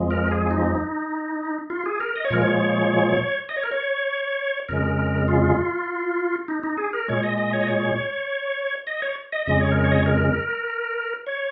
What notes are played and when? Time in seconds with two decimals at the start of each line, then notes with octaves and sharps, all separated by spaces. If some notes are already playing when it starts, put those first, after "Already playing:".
Already playing: F2 F3 G#3
0.11 A#4
0.31 G#4
0.51 D#4
1.70 F4
1.86 G#4
2.00 A#4
2.15 D#5
2.25 C#5
2.30 A#2 F3 G#3 A#4
2.42 C#5
3.49 D#5
3.56 C#5
3.63 A#4
3.72 C#5
4.69 F2 C#3 G#3 A#4
5.28 F4
6.48 D#4
6.63 D#4
6.77 G#4
6.93 A#4
7.08 A#2 G#3 C#5
7.23 D#5
7.38 D#5
7.53 C#5
7.60 D#5
7.68 C#5
8.87 D#5
9.02 C#5
9.32 D#5
9.46 F2 C#3 G#3 D#5
9.60 C#5
9.71 A#4
9.84 C#5
9.92 D#5
9.99 C#5
10.06 A#4
11.27 C#5